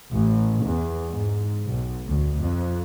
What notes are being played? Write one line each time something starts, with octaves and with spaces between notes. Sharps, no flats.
A1
E2
G#2
B1
D2
F2